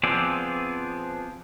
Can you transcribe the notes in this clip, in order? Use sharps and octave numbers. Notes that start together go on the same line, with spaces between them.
F3 B3 C4 G#4 D5